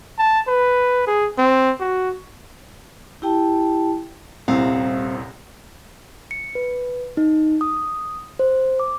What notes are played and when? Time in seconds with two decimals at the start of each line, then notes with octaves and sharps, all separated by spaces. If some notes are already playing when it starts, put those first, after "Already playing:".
0.19 A5
0.48 B4
1.07 G#4
1.38 C4
1.80 F#4
3.22 E4 G4 G5 A5
4.48 D#1 C2 C3 C4 E4 F5
6.31 C#7
6.55 B4
7.17 D#4
7.61 D#6
8.39 C5
8.80 D6